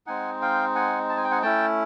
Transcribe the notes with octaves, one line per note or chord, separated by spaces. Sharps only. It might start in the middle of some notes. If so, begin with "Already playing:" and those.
G#3 C4 D#4 F#5 G#5
F5 G5
F#5 G#5
A5
G#5
G5
F#5 G#5
A3 C#4 E4 G5 A5